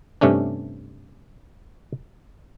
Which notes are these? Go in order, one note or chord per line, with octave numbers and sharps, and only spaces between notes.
G2 C3 A3 C#4 D4